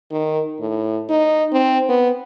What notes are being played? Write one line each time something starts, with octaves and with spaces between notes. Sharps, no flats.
D#3
A2
D#4
C4
B3